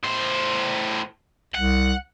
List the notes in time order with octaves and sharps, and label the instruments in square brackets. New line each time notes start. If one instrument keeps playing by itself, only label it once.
[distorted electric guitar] A2 C5
[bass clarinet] C2 [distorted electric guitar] F#5